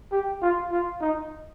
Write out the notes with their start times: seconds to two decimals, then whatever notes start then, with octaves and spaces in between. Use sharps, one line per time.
0.12 G4
0.42 F4
0.72 F4
1.01 D#4